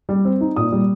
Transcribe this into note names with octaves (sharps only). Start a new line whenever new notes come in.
G3
C4
D#4
A#2 D#6
G3